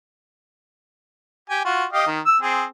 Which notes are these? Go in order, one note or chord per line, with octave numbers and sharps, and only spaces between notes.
G4 G#5
F4 F#4
G4 D#5 F5
D#3
E6
C4 G#4